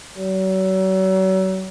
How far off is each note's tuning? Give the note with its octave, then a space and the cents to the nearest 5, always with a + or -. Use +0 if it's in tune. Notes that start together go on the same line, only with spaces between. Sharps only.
F#3 +40